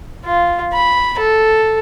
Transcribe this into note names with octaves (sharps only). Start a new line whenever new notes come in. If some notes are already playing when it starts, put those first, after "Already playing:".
F4
B5
A4